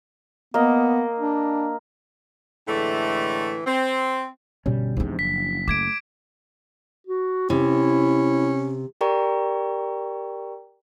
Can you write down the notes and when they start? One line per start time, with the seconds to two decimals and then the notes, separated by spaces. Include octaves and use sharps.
0.54 A#3 B3 D#5
1.20 D4
2.67 A2 D3 E3 G#3 A3
3.66 C4
4.66 G1 B2 G3 C#4
4.97 E2 G#2 C3 F3 D4
5.19 F#1 B6
5.68 A3 D6 G#6 D7
7.07 F#4
7.50 C3 C#4 E4
9.01 G4 A#4 D5 G5 A#5 C#6